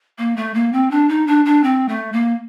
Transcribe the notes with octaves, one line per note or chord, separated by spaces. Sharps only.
A#3
A3
A#3
C4
D4
D#4
D4
D4
C4
A3
A#3